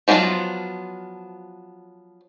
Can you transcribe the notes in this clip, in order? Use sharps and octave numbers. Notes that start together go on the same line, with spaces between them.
F3 F#3 B3 D4 F4